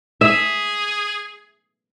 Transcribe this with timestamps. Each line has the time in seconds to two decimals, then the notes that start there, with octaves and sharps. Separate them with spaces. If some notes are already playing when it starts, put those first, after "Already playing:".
0.21 G#4 E5